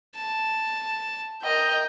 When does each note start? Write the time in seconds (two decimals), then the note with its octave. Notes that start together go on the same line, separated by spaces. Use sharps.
0.16 A5
1.42 A#4 D#5 G5